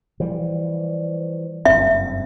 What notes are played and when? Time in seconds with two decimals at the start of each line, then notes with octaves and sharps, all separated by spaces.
0.20 E3 F3 G3
1.65 F#1 G2 C4 E5